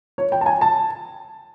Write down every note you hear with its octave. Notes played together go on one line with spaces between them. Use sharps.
C#5
G5
A5
G#5
A5